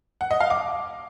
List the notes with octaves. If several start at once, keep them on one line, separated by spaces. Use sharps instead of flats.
F#5
D#5
F5
D6